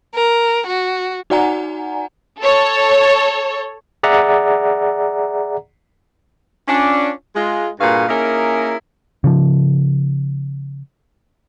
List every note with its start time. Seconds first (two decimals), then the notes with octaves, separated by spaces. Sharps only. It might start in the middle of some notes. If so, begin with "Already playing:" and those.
0.15 A#4
0.67 F#4
1.30 D#4 F#4 D5 F#5 G#5 A#5
2.41 A4 C#5
4.03 G#4 D5 E5 F#5 A#5
6.68 C#4 D4 F4
7.35 G#3 F4
7.80 G2 A#2 F#4 G#4 B4 F5
8.08 A#3 C#4 D#4 E4 G#4 A#4
9.24 C#3 F3